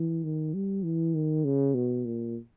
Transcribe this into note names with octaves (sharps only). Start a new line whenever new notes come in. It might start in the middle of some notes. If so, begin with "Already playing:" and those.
Already playing: E3
D#3
G3
E3
D#3
C#3
B2
A#2